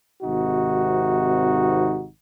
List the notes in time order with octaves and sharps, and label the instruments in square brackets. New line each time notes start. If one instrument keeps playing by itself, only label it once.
[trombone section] G#1 C3 D#4 F#4